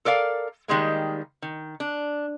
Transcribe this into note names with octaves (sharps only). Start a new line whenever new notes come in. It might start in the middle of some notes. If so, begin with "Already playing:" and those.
A4 A#4 D5 F5
D#3 G3 G#3 A#3
D#3
D4